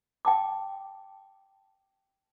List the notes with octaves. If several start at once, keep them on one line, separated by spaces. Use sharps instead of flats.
G5 A5 D6